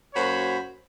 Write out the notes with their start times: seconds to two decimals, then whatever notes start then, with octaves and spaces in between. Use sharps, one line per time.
0.14 F#2 A#3 F#4 C5 C#5 B5